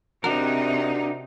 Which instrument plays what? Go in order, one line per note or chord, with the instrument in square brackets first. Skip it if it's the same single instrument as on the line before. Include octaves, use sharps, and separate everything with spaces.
[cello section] C3 D#4 [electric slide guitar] D4 F#4 A#4